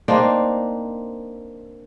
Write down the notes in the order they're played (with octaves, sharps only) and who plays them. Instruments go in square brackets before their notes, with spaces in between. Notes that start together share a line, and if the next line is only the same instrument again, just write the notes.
[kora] A#3 C4 D4 D#4